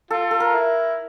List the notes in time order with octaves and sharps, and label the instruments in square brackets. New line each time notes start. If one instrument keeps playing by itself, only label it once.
[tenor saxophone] F4 [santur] A4
[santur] A4
A#4
[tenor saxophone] E4